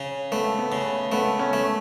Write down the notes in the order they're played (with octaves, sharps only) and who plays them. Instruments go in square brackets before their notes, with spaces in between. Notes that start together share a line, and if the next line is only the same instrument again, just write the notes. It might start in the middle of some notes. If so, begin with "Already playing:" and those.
Already playing: [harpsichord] C#3
[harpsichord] A3 [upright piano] B3
[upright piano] B3
[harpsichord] C#3
[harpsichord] A3 [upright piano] B3
[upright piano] C#4
[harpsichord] A3